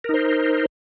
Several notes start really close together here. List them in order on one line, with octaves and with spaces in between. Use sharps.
A#4 D#4 C5